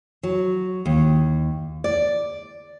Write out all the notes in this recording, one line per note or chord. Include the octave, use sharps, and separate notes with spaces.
F#3
D#2
D5